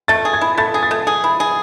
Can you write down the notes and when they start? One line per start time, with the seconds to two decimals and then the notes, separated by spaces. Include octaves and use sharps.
0.08 A3 A6
0.25 G#4
0.33 G#6
0.41 E4
0.58 A3 A6
0.74 G#4
0.83 A6
0.91 A3
1.07 G#4
1.24 E4
1.40 G#4